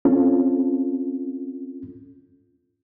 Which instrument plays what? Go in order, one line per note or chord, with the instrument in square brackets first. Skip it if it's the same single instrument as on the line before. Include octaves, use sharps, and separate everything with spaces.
[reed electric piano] C4 C#4 F4 A4